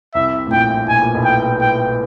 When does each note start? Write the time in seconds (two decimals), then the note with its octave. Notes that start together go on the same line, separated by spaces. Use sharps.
0.14 C2 C3 E5
0.47 A2
0.51 A#1 A#2 G5
0.88 B2 G#5
1.02 A#2
1.15 B1 B2
1.25 G5
1.61 G5